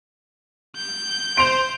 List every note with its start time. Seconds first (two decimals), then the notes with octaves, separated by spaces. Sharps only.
0.76 G6
1.37 C5 D7 F7